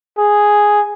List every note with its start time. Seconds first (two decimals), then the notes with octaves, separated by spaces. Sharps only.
0.18 G#4